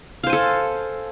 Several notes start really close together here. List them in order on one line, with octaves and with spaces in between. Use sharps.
F5 C5 G#5 A4